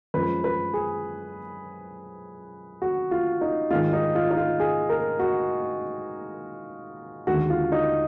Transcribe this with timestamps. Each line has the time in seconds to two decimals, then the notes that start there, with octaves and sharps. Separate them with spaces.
0.14 F#2 F3 G#3 B4
0.44 B4
0.73 G#4
2.82 F#4
3.11 F4
3.41 D#4
3.70 G#2 D#3 G#3 F4
3.93 D#4
4.15 F4
4.31 D#4
4.37 F4
4.60 G#4
4.89 A#4
5.19 F#4
7.27 D#2 D3 G#3 F#4
7.50 F4
7.72 D#4